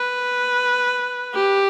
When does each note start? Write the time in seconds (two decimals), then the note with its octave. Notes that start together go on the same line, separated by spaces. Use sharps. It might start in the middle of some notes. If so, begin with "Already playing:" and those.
Already playing: B4
1.34 G4